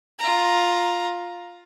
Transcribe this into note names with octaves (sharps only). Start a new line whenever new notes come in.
F4 A#5